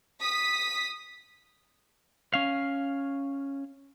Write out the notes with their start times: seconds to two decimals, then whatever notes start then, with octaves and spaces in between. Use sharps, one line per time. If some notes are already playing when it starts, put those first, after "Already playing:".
0.20 D#6 B6
2.34 C#4 F5